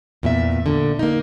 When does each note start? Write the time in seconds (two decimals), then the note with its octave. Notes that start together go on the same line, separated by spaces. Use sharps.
0.23 E2 A#2 E5
0.66 A#2 D3
0.99 A#3 D#4